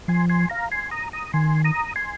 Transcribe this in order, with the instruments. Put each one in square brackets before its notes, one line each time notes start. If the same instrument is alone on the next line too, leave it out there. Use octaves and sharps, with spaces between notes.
[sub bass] F3 [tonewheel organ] G#5 C6
[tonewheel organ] G#5 C6
F5 A#5
G#5 C6
A#5 D#6
A#5 D#6
[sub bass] D#3 [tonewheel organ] G#5 C6
[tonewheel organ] A#5 D#6
G#5 C6